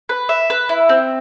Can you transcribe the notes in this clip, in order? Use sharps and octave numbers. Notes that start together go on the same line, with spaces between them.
B4
E5
B4
E4
C4